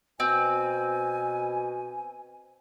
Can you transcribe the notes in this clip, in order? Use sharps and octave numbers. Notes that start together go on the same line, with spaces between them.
B2 C4 G#5